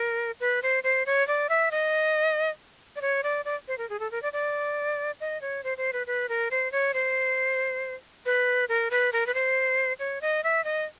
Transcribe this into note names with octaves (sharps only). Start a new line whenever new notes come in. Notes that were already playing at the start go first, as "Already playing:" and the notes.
Already playing: A#4
B4
C5
C5
C#5
D5
E5
D#5
D5
C#5
D5
D5
C5
A#4
G#4
A4
A#4
D5
D5
D#5
C#5
C5
C5
B4
B4
A#4
C5
C#5
C5
B4
A#4
B4
A#4
B4
C5
C#5
D#5
E5
D#5